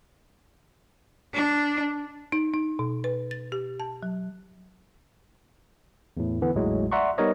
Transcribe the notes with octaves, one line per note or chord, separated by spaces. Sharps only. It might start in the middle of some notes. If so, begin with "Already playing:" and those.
D4
D#4
D#4
B2
B4
A6
G4
A5
F#3
E2 A2
D3 E3 B3
G#1 D#2 A2 F#3 G#3
D5 E5 F#5 A#5 C6 C#6
G3 B3 D#4 A#4 C#5 D#5